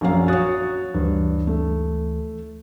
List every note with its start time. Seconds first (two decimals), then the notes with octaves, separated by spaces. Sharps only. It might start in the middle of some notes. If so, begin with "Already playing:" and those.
0.01 A#1 F#2 F5
0.28 F#4 C#5 D#6 F#6 A6
0.94 D2 G2 E3
1.47 A3